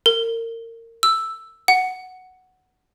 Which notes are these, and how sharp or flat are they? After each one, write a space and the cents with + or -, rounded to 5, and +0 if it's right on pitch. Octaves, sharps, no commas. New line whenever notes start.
A#4 -30
E6 +5
F#5 +5